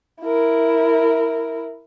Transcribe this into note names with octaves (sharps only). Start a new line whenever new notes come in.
E4 A#4